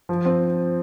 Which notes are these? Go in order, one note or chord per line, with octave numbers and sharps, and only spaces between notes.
F3
C4